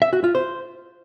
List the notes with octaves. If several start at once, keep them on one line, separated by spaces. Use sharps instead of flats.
E5
F#4
F4
C5